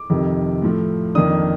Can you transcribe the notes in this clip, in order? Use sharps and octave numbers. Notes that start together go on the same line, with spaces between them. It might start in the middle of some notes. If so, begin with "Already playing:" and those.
Already playing: D6
F2 C3 D#3
A2 F3 A3
F2 D#3 A#3 D4 D#6